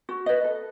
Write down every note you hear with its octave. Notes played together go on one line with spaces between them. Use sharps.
F#4
B4 D#5
A4